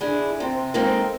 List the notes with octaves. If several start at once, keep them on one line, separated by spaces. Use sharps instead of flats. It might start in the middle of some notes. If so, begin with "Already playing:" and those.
D3 D4 E4 G#4
C3 C4
G#3 A#3 C4 D#4 A4 A#4